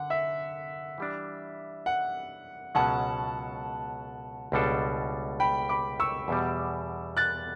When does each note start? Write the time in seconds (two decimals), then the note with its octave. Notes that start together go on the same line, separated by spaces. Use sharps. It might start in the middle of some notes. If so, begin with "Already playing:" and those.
Already playing: D3 F#5
0.10 E5
0.98 E3 G3 D4
1.86 F#5
2.75 C#2 B2 F#3 C#4 F#5 A5
4.52 C#2 B2 G3 D4 A4
5.40 G5 B5
5.69 B5 D6
6.00 C#6 E6
6.28 E2 B2 G3
7.17 F#6 A6